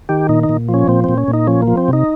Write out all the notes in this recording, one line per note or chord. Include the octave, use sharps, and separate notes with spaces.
D#3 G4
A#2 D#4
D#4
A#2
F3
C#4
A#2 C4
A#2 C4
C#4
A#2
D#4
F3 C#4
A#3
F3
C4
C3 D#4